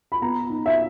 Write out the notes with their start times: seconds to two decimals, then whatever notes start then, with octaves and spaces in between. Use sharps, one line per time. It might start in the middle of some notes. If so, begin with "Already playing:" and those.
0.12 B5
0.22 B3 A#5
0.50 D#4
0.66 E5